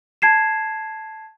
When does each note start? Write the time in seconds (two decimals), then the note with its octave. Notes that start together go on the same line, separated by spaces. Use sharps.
0.22 A5 G#6 C7 E7